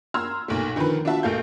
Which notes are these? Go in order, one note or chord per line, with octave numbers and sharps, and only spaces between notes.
A#5 C6 E6 F6 G#6
B1 A#2 A3
D3 D#3 F3 A#4 B4
D4 F4 F#4 E5 A5
A#1 A#2 A3 F5 G6